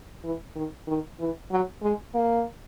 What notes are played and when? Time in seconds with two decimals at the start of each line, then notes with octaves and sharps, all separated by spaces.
0.23 E3
0.55 D#3
0.87 D#3
1.19 E3
1.51 F#3
1.82 G#3
2.14 A#3